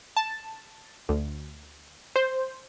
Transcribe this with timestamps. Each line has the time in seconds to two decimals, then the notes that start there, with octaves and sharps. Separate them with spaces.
0.17 A5
1.09 D2
2.16 C5